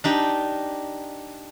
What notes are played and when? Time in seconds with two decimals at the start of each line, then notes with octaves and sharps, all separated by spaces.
0.04 D4 D#4 G4